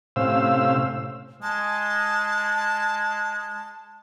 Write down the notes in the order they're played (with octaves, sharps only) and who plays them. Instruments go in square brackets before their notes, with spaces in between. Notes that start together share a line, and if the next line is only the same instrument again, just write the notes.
[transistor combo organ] A2 C3 C#4 C5 F5 E6
[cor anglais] G#3 [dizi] A5